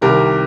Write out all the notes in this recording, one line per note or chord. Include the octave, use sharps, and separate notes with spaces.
C2 C3 D#3 G4 A#4